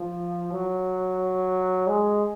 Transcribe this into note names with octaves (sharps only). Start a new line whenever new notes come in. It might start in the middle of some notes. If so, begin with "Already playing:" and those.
Already playing: F3
F#3
G#3